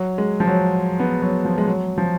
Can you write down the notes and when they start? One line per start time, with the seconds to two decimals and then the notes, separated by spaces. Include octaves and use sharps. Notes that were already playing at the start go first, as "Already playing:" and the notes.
Already playing: F#3
0.18 G#3
0.40 F3
0.47 F#3
1.00 B3
1.22 F#3
1.45 F3
1.58 G#3
1.68 F#3
1.98 F3